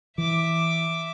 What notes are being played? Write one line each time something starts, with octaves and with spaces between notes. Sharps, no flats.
E3 E5 D6